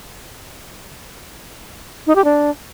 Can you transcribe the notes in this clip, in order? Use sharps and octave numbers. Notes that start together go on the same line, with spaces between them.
D#4
G4
D4